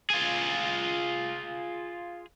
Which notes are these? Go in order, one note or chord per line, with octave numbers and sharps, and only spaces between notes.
F4 G#4